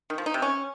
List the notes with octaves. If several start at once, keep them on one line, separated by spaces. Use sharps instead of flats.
D#3
F3
D#4
C3
C#4